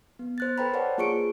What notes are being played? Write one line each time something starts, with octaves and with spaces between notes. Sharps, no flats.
B3
C5 F#6 A6
A4 B4 C5 G5 A#5 B5
A#4 B4 C#5 D5 F#5 A5
A#3 F4 G#4 C#6 C#7 D7